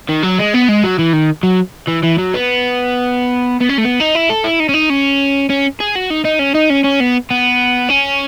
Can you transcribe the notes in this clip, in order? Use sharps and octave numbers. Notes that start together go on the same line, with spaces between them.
D#3
F#3
G#3
B3
G#3
F#3
E3
D#3
F#3
E3
E3
F#3
B3
B3
C#4
A3
B3
D#4
E4
A4
E4
D#4
C#4
D#4
C#4
C#4
G#4
F#4
D#4
D#4
C#4
D#4
C#4
C#4
B3
B3
C#4